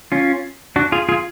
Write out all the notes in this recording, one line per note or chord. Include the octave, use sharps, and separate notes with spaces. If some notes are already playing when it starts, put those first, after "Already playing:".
C#4 F4
D4 F#4
F4 G#4
F4 G#4